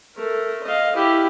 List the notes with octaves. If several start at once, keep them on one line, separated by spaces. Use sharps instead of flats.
A3 A#4
D#5 F5
E4 G4